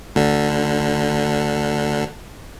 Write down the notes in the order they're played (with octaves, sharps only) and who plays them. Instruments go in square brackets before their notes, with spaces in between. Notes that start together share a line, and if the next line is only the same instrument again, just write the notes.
[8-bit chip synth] D2 D3